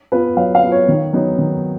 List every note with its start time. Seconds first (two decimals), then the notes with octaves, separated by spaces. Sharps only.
0.12 B3 F4 B4
0.37 F#3 F5
0.55 F5
0.63 B3 F4
0.72 C#5
0.88 D#3
1.13 F#3 B3 D#4
1.39 D#3